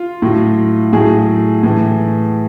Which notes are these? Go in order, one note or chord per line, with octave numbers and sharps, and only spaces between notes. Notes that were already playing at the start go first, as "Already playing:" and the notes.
Already playing: F4
A2 F#3
A2 F#3 G#4
A2 E3